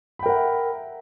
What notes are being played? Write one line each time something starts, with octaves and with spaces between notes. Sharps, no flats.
A#4 E5 F#5 G5 B5